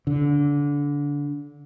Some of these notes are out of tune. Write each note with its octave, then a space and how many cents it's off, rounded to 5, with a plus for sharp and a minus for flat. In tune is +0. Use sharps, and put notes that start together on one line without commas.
D3 -25